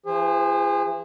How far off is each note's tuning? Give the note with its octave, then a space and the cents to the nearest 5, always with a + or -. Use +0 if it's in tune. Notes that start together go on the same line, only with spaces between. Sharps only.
E3 +45 G#4 -35 C5 +0